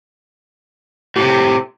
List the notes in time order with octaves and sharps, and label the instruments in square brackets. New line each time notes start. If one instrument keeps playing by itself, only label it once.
[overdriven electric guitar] A2 C3 [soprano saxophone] G4